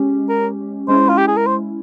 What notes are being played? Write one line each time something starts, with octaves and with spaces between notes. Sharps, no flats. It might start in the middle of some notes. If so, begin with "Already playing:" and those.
Already playing: G#3 C#4 G4
A#4
G#3 C#4 E4 C5
F4
G4
G#4
A#4
C5